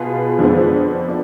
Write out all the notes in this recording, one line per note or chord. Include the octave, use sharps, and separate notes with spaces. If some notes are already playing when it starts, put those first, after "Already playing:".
Already playing: B2 B3 F4 G#4
F2 D3 F3 G#3 B3
D4